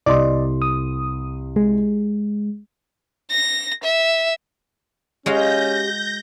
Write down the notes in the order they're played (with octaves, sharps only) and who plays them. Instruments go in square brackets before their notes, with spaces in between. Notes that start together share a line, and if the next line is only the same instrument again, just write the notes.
[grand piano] C2 C6 [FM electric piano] D5 D#5
[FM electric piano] D#6
G#3
[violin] A#6
E5
[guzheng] G#3 F#4 F5 [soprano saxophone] C#4 [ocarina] G4 [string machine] G6 A#6